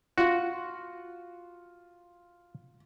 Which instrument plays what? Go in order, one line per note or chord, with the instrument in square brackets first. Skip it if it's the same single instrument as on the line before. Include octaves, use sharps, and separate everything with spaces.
[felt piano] F4 [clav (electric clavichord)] F#4